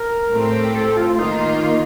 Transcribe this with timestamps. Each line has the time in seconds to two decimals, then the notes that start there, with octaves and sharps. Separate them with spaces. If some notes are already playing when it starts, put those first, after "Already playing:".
Already playing: A#4
0.31 A2 A3 C4 G4 C5
0.74 A4
0.96 F4
1.17 D#3 A#3 D#4 F4